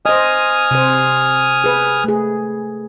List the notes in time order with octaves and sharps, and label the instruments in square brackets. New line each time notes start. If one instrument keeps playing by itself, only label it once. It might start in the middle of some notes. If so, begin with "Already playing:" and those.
[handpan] C5 D#5 [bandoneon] G#5 D#6 F6
[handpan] C3 C5
G#4 B4
A3 G#4